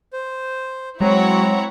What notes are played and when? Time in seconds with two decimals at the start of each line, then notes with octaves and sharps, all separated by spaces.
0.13 C5
1.01 F#3 G#3 C4 E4 C#5 F#5 A#5